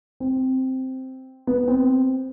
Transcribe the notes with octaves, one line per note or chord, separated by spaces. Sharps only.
C4
B3
C4